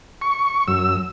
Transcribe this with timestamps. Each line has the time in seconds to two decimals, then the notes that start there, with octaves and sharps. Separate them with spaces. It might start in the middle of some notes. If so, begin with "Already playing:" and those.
0.21 C#6
0.68 F#2 E6